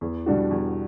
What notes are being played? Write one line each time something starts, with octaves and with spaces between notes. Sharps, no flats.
E2
B2 G3 D4 F#4
E2